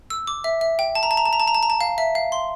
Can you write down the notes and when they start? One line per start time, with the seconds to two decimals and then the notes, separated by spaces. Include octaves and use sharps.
0.10 E6
0.27 D6
0.44 E5
0.61 E5
0.79 G5
0.95 A5
1.03 A#5
1.11 A5
1.17 A#5
1.25 A5
1.33 A#5
1.40 A5
1.48 A#5
1.55 A5
1.63 A#5
1.70 A5
1.81 F5
1.98 E5
2.15 F5
2.32 C6